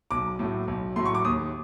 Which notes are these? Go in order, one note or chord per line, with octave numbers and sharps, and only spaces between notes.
B1 D6
A2 F#3 A3
B1
A2 F#3 A3 C6
C#6
D6
D#2 D#6